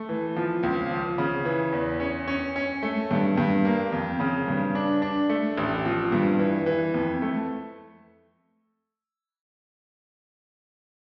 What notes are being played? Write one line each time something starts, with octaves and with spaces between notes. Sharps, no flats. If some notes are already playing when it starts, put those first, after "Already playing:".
Already playing: A3
E3
F3
C#2
F3
C#3
E3
E2
C#4
C#4
C#4
A3
G2
G2
A#3
F2
C#3
G2
D4
D4
A3
A1
F3
G2
E3
E3
F2
A3